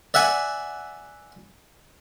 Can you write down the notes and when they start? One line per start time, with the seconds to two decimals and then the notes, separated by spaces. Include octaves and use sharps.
0.14 D5 E5 F#5 G#5